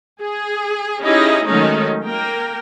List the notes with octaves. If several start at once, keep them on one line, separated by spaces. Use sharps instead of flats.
G#4
C#4 D#4 E4 G4 G#4 D#5
D#3 F#3 G#3 A3 C#4 D#4
A#3 A#4 G5